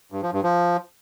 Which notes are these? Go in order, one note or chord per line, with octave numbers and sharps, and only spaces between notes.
G2
F3
G2
F3